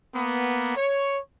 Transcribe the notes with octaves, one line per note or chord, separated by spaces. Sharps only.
A#3 B3
C#5